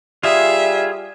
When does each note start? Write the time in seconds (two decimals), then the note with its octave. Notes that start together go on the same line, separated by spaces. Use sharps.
0.24 G3 F4 G#4 E5